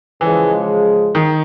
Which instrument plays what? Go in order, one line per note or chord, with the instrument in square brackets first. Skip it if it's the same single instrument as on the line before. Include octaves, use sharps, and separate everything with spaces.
[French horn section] C#3 F3 G#3 [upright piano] E3
[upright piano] D#3